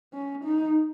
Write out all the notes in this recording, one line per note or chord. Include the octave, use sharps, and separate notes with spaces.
C#4
D#4